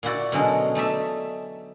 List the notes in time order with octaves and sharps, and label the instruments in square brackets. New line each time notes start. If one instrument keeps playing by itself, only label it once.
[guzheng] A#2 E4 F#4 D5
B2 D3 F#3 G#3 C#4
A3 D#4 D5 E5